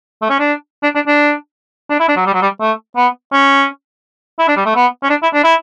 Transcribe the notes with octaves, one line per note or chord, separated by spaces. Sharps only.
A3
C#4
D4
D4
D4
D4
D4
E4
D4
F#3
G3
F#3
G3
A3
B3
C#4
E4
D4
G3
A3
B3
C#4
D4
E4
D4
E4